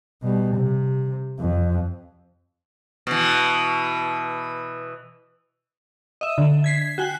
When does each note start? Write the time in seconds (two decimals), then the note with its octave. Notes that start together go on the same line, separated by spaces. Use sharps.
0.23 B2 G3
0.55 C3
1.39 F2
3.07 B2 E3
6.21 D#5 E5
6.38 D3
6.64 G#6 B6 C7
6.98 F#4 G5 G#5 F#6